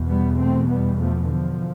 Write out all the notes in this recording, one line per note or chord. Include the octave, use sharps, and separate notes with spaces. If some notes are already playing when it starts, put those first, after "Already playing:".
Already playing: E2 B2
G3 B3
A3 C4
G3 B3
F3 A3
D3 F3